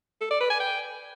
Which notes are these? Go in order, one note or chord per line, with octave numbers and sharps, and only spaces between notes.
A4
D5
B4
G#5
G5